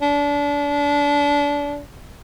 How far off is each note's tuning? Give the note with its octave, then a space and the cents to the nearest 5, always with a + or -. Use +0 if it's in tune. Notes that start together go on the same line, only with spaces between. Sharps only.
D4 -30